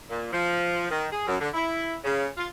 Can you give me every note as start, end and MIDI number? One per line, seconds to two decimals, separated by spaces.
0.10 0.31 46
0.33 0.86 53
0.90 1.07 51
1.12 1.25 68
1.27 1.36 42
1.40 1.48 50
1.54 1.95 64
2.04 2.26 49
2.37 2.47 65